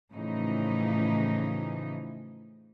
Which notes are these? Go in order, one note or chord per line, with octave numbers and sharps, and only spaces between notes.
A2 C#3 E3 F3 D#4